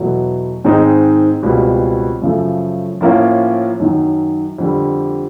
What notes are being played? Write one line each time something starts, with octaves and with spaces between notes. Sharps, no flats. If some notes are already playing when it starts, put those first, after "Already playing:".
Already playing: E2 B2 F#3 A3
G#2 D#3 G#3 C4 D#4
C#2 B2 G3 C4
F#2 C#3 F3 A3
A2 F3 A#3 C#4 F4
F#2 D#3 F#3
F2 D3 G3